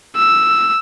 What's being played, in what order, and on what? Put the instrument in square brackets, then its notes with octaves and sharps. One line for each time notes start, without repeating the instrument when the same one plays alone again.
[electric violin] E6